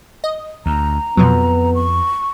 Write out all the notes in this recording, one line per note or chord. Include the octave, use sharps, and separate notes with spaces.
D#5
D2 A#5
F2 B2 F3 F#3 B3
C#6